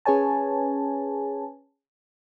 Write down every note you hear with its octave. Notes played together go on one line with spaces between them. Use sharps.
C#4 G#4 B4 C#5 G#5 A5